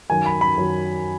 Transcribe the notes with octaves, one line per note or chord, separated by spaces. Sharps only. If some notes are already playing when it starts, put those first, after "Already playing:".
F#2 D#3 F#3 G#5
B5
B5
F#2 D#3 F#3